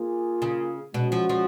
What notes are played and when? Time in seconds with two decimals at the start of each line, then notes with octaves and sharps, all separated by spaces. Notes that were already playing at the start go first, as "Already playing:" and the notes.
Already playing: A#3 F4 G#4
0.42 C#3
0.94 B2 G#3 C#4 F#4
1.12 F3
1.29 F3